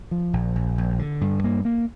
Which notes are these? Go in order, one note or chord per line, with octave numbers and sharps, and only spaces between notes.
F3
A#1
A#1
A#1
D3
G2
A#3
A#3